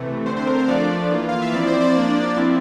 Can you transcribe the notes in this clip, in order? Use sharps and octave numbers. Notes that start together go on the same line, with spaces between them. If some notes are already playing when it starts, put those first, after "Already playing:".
Already playing: C3 E3 A3
D3 A3 C4 C5
C5
A#4
C5
F3 A3 D4 F4 D5
E3 A#3 F4
F5
E5
F3 C4 E4 D5
C5
D5
F3 A#3 D4
F3 C4 E4